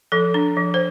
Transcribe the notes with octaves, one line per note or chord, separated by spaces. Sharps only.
F3 A4
D4
F3
C5